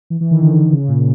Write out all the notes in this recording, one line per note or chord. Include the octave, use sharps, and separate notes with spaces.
E3
E3
D#3
D3
C#3
A#2